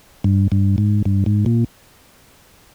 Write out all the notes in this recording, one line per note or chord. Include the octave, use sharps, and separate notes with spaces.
G2
G2
G#2
G2
G#2
A#2